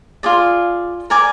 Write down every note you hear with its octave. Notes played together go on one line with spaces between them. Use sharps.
F4 G#4 D5
A#4 D5 G#5 D6